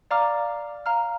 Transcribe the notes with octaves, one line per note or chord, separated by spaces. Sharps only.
D5 F5 A#5 D6 F6
F5 A#5 F6